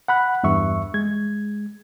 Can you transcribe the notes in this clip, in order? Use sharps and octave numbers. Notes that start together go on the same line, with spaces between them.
F#5 B5 F#6
E2 G2 E5 C#6
G#3 G#6